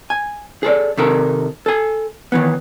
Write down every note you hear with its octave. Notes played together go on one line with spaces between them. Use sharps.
G#5
G#4 A4 C5 D5
C3 D#3 A4 A#4
A4 G#5
D#3 E3 B3